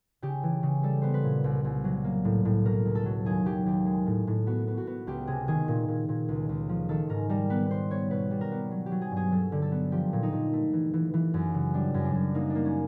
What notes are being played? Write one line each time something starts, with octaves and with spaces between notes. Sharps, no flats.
C#3 G4
E3
C#3
G3 A4
B3 C5
B4
A#2
C2
C2
F#3
A#3
A2
A2
B2 A#4
C#2
A4
F#3
D#2 G#4
F#3 G4
D#2 G4
G#3
A2
A2
B3 F#4
B3
F#4
B3
C#2 G4
C3 G#4
D#3 G#4
A#2
A#2
A#2
C#2
C#2
F3
D#3 A4
G#2 A#4
G3 A#4
B3 B4
B3 C5
B3 C#5
B2 B4
G3
A#4
B3
F#3
G4
F#3
G#4
G2
G#4
F#3 A4
D3
A4
B3
F3 G4
A#2
D#4
A#2
A3
E3
E3
E3
F#2
C#3
G3 D4
F#2
D4
F#2
A#3 D#4
D4
A#3
C#4